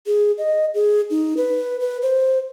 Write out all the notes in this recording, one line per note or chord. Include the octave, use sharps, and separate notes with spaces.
G#4
D#5
G#4
D#4
B4
B4
C5